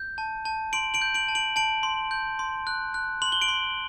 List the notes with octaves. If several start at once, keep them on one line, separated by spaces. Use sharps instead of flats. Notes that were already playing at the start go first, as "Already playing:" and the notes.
Already playing: G6
A5
A5
C6 D7 F#7
D7 F#7
G6
D7 F#7
A5
D7 F#7
A5 D7 F#7
C6
G6
C6
F#6
F#6
C6 F#7
G7
D7 F#7
C6